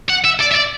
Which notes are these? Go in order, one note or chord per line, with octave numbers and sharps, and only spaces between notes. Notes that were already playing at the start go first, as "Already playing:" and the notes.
F#5
E5
D5
E5
D5